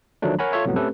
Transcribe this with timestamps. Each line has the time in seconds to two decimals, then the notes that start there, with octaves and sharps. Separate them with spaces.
0.22 D2 D#3 F3 F#3 A3 D4
0.39 A#4 C#5 F#5 G#5 A#5 B5
0.52 F4 A4 C#5 E5
0.65 C2 F2 A2 F#3 B3
0.76 A3 C4 C#4 G4 A4 B4